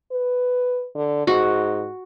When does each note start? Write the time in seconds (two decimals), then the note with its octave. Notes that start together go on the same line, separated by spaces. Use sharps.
0.11 B4
0.95 D3
1.27 G#2 F#4